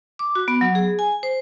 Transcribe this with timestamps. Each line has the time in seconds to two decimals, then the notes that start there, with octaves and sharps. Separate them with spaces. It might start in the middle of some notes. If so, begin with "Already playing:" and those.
0.19 D6
0.35 F#4
0.48 B3
0.61 F#3
0.75 G#4
0.99 G#5
1.23 C5